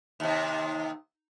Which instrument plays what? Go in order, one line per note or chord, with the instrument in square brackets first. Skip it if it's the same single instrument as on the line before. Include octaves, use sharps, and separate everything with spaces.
[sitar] D#2 C3